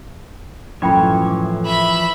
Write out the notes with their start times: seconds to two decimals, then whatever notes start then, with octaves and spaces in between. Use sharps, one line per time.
0.82 F#2 A2 E3 F3 E4 C#5 G5 B5
1.27 D6
1.66 E5 B5